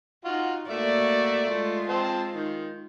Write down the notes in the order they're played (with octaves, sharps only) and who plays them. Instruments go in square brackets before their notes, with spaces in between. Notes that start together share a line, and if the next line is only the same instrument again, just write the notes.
[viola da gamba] D#4 [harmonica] F4 F#4
[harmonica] A3 E5 [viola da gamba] A#3 F#4 D5
[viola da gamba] G#3 F4 [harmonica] A3
[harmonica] C4 C5 A5
D#3